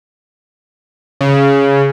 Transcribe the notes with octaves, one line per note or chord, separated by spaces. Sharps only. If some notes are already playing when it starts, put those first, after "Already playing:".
C#3